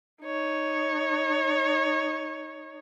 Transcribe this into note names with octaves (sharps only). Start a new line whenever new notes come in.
D#4 C#5